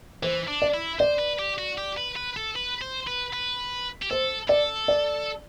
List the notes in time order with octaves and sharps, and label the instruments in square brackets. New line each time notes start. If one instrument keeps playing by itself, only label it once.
[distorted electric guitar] E3 [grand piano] C5
[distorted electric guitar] D4
[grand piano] D5
[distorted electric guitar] E4
[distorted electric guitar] C5 [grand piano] D5
[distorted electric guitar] B4
G4
F#4
G4
B4
B4
A4
B4
C5
B4
B4
G4
[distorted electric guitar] A4 [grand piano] C5
[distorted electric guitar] A4 [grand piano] D5
[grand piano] D5